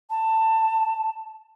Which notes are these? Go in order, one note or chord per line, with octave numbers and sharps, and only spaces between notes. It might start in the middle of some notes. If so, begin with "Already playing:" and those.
A5